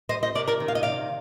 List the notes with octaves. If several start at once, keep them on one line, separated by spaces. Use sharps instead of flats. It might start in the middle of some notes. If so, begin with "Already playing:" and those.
G3 C5 D#5
C5 D#5
C3 A#4 D5
A#4 D5
D#3
F5
D#5
C3 D5 F5